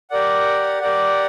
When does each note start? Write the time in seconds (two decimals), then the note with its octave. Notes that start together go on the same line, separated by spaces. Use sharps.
0.10 G4 A#4 D5 F#5
0.81 G4 A#4 D5 F#5